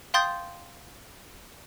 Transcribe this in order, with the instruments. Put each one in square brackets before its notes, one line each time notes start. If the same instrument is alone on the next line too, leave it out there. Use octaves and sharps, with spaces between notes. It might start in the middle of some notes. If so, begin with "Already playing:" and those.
[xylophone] F5 G5 C6 D#6 G6 A6